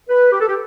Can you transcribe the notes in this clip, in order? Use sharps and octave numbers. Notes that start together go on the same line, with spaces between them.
B4
G4
A4
G4